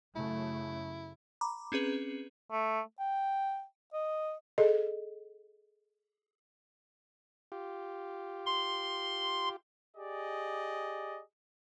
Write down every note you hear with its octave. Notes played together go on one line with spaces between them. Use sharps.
F#2 C#3 A3 E4
A#5 B5 D6
C4 C#4 G#4 B4
A3
G5
D#5
G#4 A4 D#5
F4 G4
C6
G4 G#4 D5 D#5